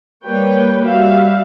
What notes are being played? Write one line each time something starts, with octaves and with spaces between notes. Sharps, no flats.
G3 A#3 B4 C#5 G5
G3 F#4 E5 F5